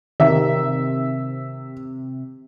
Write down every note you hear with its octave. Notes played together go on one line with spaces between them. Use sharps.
C3 D#3 E5